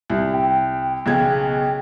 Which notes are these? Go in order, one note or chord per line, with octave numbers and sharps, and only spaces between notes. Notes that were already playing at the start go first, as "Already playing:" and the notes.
C2
G5
B1 C#3 G#6